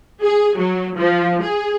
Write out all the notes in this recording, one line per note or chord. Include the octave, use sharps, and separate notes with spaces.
G#4
F#3
F3
G#4